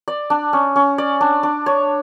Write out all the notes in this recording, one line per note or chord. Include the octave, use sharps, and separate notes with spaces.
D5
D4
C#4
C#4
D5
D4
D4
C#5